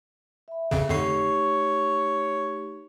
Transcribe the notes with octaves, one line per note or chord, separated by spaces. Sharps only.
E5 B5
A1 F2 C#3
F2 D3 A3 D#4 G4 C#5 C7